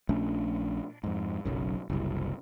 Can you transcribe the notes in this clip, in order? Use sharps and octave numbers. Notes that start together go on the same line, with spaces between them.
A#1 A3 C#4 D4
F2 G#2
F#1 B1 F#2
F#1 C2